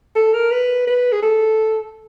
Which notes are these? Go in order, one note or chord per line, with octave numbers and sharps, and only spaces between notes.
A4
A#4
B4
B4
G#4
A4